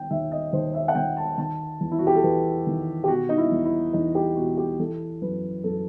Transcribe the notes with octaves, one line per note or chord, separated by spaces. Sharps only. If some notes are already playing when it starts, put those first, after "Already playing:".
Already playing: D#3 G5
D#2 E5
D#5
D#2 C5
E5
F#5
D#3 G5
A5
D#3 A5
E2
E4
F#4
G4
A4
E2 B4
D#3
G4
B2 F#4
D#4
E4
E2
E4
E2 D#4
G4
B2 F#4
G4
E3 A4
F#2 B4
F#2 A4